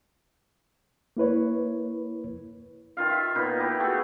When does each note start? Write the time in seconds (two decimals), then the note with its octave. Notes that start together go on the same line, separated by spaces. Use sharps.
1.17 A#3 E4 B4 C#5
2.97 D#3 F4 F5
3.10 E5
3.35 A#2 B3 D#4
3.60 B3 E4 G4
3.80 A3 F#4 G#4 G5